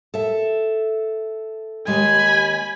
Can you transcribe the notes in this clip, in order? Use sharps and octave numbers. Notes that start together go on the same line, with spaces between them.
A4 E5
D#2 G#3 G4 G#5 B5